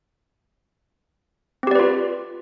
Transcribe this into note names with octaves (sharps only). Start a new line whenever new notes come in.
C4 F4 G4 B4 D5